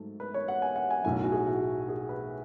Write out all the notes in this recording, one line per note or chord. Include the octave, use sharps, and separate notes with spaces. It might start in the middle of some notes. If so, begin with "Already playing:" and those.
Already playing: G#2 F#3 A3
B4
C#5
F#5
G#5
F#5
G#5
B1 A2 F#3 G#5
F#4
G#4
F#4
G#4
B4